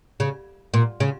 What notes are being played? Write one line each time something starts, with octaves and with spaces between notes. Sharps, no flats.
C#3
A#2
C#3